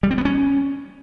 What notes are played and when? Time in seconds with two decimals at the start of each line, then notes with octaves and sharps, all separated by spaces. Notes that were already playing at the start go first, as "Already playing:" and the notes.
0.03 G3
0.11 C4
0.18 B3
0.25 C#4